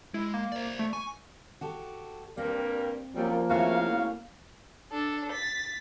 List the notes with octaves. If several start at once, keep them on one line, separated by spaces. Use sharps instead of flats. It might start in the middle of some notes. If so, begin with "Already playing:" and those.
G#3 E4
A#3
C5 D5
A3
G#5 C#6
F#4 G4 A4
G2 G3 A#3 C4
F#2 F3 G3 A#3
C#3 A3 C4 E4 F#4 F5
D4 A4
A6 B6